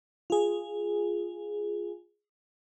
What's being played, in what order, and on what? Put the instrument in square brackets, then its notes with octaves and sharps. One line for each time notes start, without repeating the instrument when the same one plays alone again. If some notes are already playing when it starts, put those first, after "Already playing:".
[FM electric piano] F4 G#4